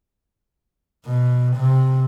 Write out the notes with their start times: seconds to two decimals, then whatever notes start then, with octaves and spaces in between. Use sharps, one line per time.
1.06 B2
1.56 C3